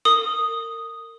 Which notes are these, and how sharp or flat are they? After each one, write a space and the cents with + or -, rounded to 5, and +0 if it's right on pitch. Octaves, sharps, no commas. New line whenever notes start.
A#4 -35 D#6 +0